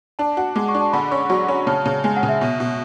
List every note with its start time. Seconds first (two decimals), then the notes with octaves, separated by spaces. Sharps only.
0.19 D4 A5
0.37 F#4
0.56 G#3 D6
0.68 C#6
0.75 D4
0.81 A5
0.93 D3 B5
1.11 C#4 C#6
1.30 F#3 C#6
1.48 C#4 B5
1.67 C#3 A5
1.86 C#3
2.04 G#3 G#5
2.17 F#5
2.23 C#3
2.29 E5
2.41 B2
2.60 B2